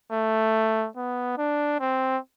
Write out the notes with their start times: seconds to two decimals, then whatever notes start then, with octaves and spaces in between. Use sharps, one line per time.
0.12 A3
0.96 B3
1.38 D4
1.80 C4